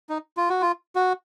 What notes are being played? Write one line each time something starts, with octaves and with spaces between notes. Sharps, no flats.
D#4
F4
F#4
F4
F#4